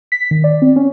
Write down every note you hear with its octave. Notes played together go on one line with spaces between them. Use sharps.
B6
D#3
D5
C4
C#4